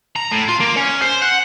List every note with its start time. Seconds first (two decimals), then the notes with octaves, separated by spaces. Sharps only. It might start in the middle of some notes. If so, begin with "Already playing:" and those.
0.16 A#5
0.31 A2
0.48 F4
0.60 A#3
0.77 C#4
1.02 C5
1.22 F#5